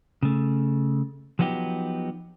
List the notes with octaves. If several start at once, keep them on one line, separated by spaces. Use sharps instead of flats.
C#3 A3
F3 F#3 B3 D#4 G4